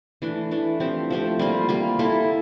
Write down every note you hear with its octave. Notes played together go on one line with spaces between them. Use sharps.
E3 A3 D4
E3 A3 D4
F3 A3 C4 G4
F3 A3 C4 G4
G3 A#3 F4
G3 A#3 F4
A#3 E4 A4